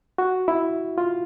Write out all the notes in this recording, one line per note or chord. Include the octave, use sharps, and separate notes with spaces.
F#4
E4
F4